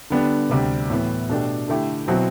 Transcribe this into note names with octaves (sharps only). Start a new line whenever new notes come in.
D3 G3 B3 D4
D2 C3 G3 D4
A2 E3 B3
B2 A3 D4 G4
D3 A3 E4 G4
B2 F#3 C4 E4